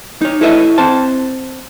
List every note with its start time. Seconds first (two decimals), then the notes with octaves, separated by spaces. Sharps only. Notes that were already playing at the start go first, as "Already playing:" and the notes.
0.21 D#4 C#5
0.41 E4 A4 B4 C#5 D#5 E5
0.78 C4 C5 A5